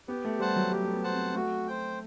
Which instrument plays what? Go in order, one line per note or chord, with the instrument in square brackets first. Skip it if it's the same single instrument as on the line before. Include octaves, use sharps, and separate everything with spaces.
[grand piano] B3 [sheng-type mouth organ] G4
[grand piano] A3
[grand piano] G3 [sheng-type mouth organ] C5 F#5 A5
[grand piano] F#3
[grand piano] G3 [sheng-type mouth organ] G4
[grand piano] A3
B3
[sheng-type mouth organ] C5 F#5 A5
[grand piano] C4
[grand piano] A3 [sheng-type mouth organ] F#4
[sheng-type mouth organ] C5 G5